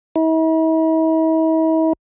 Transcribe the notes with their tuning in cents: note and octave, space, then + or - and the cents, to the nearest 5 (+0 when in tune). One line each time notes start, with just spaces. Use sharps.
E4 -45